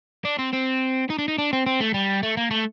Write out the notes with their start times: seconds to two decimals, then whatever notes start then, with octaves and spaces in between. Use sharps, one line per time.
0.25 D4
0.39 C4
0.53 C4
1.10 D#4
1.19 D4
1.28 D#4
1.38 D4
1.53 C4
1.66 C4
1.80 A3
1.94 G3
2.23 A3
2.37 A#3
2.51 A3